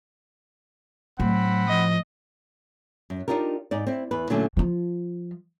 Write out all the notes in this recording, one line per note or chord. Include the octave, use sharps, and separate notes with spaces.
A2 F#3 C4 F#5 B5
F3 D#5
F#2
D4 D#4 F4 G4 A#4
G#2 D#4 D5
C4 E4
E2 B4
A#2 D3 F#3 A3 C#4 F4
F3 F4